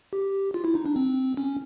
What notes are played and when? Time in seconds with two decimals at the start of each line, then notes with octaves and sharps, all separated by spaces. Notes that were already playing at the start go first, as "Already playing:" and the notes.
0.13 G4
0.54 F4
0.65 E4
0.75 D#4
0.86 D4
0.96 C4
1.37 C#4